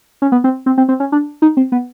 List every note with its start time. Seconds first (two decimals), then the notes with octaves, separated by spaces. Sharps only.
0.22 C#4
0.32 B3
0.44 C4
0.66 C4
0.78 C4
0.89 C4
1.00 C#4
1.12 D4
1.42 D#4
1.57 C4
1.72 B3